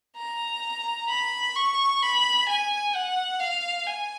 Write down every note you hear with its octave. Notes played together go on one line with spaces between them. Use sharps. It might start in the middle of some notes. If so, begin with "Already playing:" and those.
A#5
B5
C#6
B5
G#5
F#5
F5
G#5